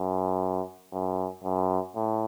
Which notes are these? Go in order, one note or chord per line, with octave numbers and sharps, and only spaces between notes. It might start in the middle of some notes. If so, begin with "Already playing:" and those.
Already playing: F#2
F#2
F#2
A2